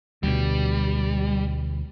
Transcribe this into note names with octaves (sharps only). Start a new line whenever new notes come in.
D2 B2 G3